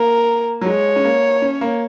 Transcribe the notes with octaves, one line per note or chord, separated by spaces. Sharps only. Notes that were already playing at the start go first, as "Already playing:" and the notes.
Already playing: A#3 A#4
F#3
G#3 C#5
C#4
A#3
C#4
A#3